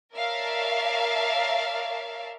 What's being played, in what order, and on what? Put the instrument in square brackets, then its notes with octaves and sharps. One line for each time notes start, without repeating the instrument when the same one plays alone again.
[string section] A#4 C#5 D5 E5 F5 A5